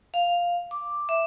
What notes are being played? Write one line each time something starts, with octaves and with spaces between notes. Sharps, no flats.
F5
D6
E5